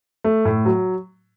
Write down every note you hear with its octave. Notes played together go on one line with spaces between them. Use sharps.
A3
A2
F#3